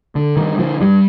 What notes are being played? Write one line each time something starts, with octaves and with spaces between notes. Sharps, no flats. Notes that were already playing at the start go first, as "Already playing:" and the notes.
D3
G2 D#3
D3 F3
G2 G3